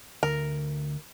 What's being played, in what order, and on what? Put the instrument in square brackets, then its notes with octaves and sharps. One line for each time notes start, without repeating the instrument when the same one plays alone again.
[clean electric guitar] D2 [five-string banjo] A#4